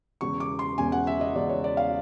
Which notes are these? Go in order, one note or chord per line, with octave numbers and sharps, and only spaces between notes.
E1 E2 C#3 C#6
D6
C6
E1 E2 C#3 G#5
F#5
E5
D#5
E1 E2 C#3 D5
C#5
D5
F5